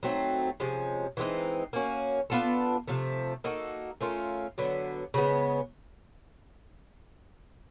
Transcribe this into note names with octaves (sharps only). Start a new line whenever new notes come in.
F#3 A3 C4 D#4
C3 F3 G#3 C#4
E3 G#3 C4 D#4
A#3 C#4 F#4
B3 D4 F4 A4
C3 F3 A3
A#3 D#4 F#4 A4
A3 C#4 F4 A#4
D3 F#3 B3
C#3 E3 G#3 B3